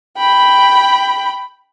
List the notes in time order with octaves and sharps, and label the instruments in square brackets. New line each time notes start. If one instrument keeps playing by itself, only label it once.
[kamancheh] G5 B5